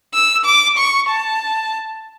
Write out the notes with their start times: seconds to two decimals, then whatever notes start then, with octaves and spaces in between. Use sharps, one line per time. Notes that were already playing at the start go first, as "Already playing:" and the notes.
0.14 E6
0.45 D6
0.77 C#6
1.09 A5